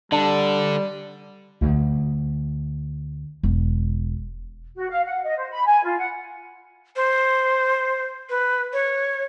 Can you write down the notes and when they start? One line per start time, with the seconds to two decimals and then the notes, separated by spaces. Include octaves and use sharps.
0.12 D3 G3 D4
1.61 D2
3.43 E1
4.76 F#4
4.90 F5
5.06 F#5
5.24 D#5
5.38 C5
5.51 B5
5.66 G#5
5.84 F4
5.98 F#5
6.96 C5
8.30 B4
8.73 C#5